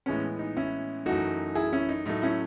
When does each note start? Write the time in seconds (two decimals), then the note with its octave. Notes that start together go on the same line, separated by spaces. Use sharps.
0.06 A2 E3 G#3 B3 C#4
0.39 D#4
0.57 C#4 E4
1.06 F#2 E3 A3 D#4 F#4
1.55 E4 G#4
1.73 C#4 E4
1.89 D#4
2.06 A2 F#3 A3 D#4
2.22 C#4 E4